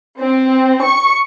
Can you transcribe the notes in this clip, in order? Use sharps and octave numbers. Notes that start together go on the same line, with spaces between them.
C4
C#6